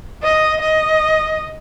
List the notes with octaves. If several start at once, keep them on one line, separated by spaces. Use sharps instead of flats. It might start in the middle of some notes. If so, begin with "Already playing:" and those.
D#5
D#5